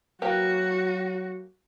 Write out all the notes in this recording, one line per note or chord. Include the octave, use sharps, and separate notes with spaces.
F#3 A#3 F#4 G4 B4